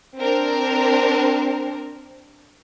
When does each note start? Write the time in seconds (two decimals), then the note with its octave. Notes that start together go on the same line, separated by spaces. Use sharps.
0.19 C4 D4 A#4